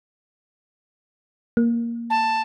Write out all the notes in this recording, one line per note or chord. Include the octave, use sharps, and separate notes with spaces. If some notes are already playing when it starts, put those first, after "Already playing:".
A#3
A5